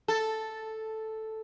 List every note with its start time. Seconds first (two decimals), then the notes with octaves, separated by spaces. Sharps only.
0.08 A4